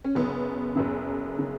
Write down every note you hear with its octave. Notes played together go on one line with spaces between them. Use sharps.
C#4
F#1 F#2 C#3 B3
F#1 F#2 C#3
C#3